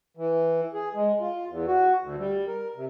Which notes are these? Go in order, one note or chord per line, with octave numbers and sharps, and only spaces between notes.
E3
G#4
G#3
F4
E2
F#4
D2
G3
A#4
C3